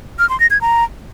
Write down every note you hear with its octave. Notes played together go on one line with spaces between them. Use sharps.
F6
C6
A#6
G#6
A#5